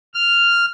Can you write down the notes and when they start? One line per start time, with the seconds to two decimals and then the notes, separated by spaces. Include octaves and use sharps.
0.14 F6